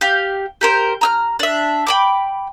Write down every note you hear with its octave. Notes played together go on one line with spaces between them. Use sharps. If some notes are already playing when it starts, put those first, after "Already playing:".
G4 F5
G4 A#4 C5
A#5 E6 F6
D4 E5
G5 B5 D6